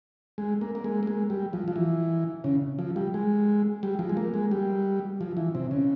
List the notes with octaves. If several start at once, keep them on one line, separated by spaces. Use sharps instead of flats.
G#3
A#3
A#3
G#3
A#3
G#3
G3
F3
F3
E3
C#3
F3
G3
G#3
G3
F3
G#3
A#3
G#3
G3
F3
E3
C3
C#3